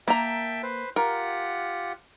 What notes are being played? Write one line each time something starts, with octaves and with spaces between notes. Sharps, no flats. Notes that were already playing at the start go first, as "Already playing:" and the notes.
A#3 E5 G5 A5 A#5
B4 C5
F4 G4 A#4 F#5